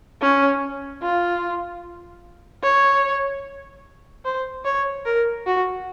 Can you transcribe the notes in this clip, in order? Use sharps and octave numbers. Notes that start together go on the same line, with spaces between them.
C#4
F4
C#5
C5
C#5
A#4
F#4